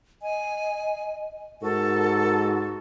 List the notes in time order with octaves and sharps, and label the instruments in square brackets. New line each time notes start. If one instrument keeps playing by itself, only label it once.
[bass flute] D#5 [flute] G#5
[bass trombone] G#2 [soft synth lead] F#4 [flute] A4 [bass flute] A#4